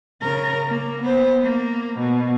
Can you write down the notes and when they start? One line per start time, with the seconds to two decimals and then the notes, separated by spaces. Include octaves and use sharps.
0.22 C#3 A#4
0.68 A#3
1.01 B3 C5
1.43 A#3
1.98 B2